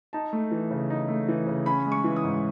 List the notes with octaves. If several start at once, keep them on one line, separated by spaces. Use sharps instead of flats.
D#4 A5
A3
E3
C#3
D#4
A3
E3
C#3
C#4 B5
G#3
C#6
E3
D#6
G#2